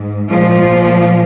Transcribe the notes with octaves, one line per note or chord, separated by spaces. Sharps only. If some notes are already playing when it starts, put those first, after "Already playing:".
Already playing: G#2
A#2 F3 G#3